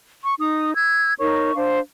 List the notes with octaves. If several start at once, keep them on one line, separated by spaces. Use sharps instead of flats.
C#6
D#4 D#6
E6 G#6
D#4 A#4 C#5 C#6
D4 C5 F5